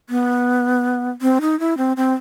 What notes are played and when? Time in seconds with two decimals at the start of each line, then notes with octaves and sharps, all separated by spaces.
0.10 B3
1.22 C4
1.41 D#4
1.60 E4
1.77 C4
1.97 C4